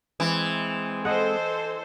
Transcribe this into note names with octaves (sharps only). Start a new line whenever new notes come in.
E3 G#3 C4
A4 C5 D#5 F#5